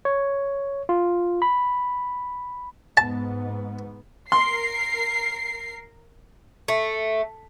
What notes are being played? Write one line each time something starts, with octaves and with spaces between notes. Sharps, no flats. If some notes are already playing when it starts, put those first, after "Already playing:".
C#5
F4
B5
G#2 B3 A5
A#4 C6 C7
A3